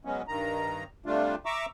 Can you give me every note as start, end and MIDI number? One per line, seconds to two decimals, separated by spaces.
0.05 0.22 54
0.05 0.22 56
0.05 0.22 59
0.05 0.22 61
0.28 0.84 43
0.28 0.84 51
0.28 0.84 82
1.06 1.35 48
1.06 1.35 55
1.06 1.35 57
1.06 1.35 62
1.06 1.35 65
1.46 1.66 76
1.46 1.66 82
1.46 1.66 85
1.46 1.66 86
1.46 1.66 88